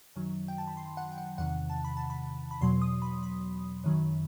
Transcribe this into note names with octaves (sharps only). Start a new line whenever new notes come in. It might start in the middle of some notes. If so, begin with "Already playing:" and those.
F#2 D#3 F#3
G5
A5
B5
C6
F#5
G5
F#5
E2 C3 D#3 F#5
A5
B5
A5
B5
B5
E2 B2 F#3 C6
D#6
B5
B5
F#2 D#3 F#3